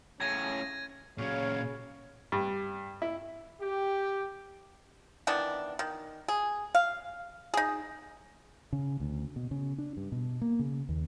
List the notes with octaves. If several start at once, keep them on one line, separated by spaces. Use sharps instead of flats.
A2 C#3 C#4 G#6 A#6 D#7
A#2 C#3 F#3 C#4 C#5 F5
G2
E4
G4
D#3 E3 B3 D4
D#3
G#4
F5
D#4 G#4
C#3
D2
B2
C#3
D4
G2
B2
A#3
C#3
D#2